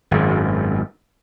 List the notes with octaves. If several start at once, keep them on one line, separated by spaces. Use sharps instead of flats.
G#1 F#2